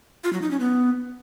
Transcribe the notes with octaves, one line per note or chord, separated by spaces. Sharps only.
F4
F#3
D#4
C#4
B3